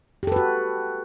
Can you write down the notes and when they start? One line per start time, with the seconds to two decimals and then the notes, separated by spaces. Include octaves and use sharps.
0.23 G4
0.27 A4
0.32 B4
0.36 F#4